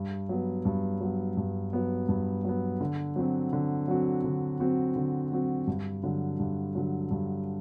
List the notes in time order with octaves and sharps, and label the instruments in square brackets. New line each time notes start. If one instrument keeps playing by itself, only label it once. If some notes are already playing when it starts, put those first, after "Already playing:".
Already playing: [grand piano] G2
F#3 B3
G2
F#3 B3
G2
F#3 B3
G2
F#3 B3
D3
F#3 C4 F#4
D3
F#3 C4 F#4
D3
F#3 C4 F#4
D3
F#3 C4 F#4
G2
D3 F#3
G2
D3 F#3
G2